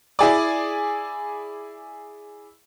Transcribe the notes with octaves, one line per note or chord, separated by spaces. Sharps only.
E4 G#4 D5